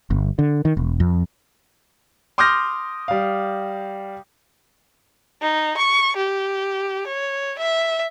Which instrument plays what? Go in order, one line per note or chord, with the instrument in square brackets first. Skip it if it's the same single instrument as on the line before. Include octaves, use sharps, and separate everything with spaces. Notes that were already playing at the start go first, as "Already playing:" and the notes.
[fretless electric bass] G1
D3
D#3
E1
F2
[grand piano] C6 D6 D#6 F6 G6 A#6
G3 F5
[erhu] D#4
C#6
G4
C#5
E5